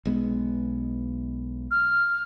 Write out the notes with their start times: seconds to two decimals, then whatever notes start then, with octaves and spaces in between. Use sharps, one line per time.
0.05 B1 G#3 B3
1.71 F6